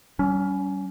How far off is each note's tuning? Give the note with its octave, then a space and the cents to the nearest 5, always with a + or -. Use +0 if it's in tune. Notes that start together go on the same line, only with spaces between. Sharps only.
G3 -35 C#4 +20